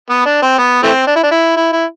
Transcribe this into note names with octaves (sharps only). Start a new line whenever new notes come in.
B3
D4
C4
B3
E3 A3 C4
D4
E4
D4
E4
E4
E4